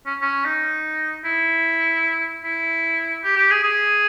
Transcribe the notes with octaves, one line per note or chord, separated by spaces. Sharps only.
C#4
C#4
D#4
E4
E4
G4
G4
G#4
G#4